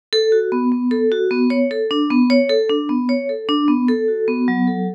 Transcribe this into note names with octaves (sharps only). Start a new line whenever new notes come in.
A4
F#4
B3
B3
A4
F#4
B3
C#5
A4
D4
B3
C#5
A4
D4
B3
C#5
A4
D4
B3
A4
F#4
B3
F#3
A4